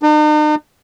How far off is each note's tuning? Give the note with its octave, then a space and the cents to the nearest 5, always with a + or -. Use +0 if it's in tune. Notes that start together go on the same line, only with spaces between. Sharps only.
D#4 -45